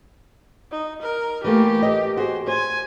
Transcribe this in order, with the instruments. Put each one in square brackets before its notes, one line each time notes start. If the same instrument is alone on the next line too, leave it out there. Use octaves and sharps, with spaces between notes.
[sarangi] D#4
A#4
[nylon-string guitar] E3 A3 A#3 [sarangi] G4
[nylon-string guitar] D#5
[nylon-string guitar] F#4 G#4 [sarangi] C5
[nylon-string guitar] C5 [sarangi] G#5